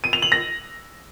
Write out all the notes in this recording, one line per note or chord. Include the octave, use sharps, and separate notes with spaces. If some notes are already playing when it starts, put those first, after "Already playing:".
D#7
F7
F#7
A#6